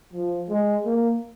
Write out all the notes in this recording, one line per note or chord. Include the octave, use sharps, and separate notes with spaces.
F3
G#3
A#3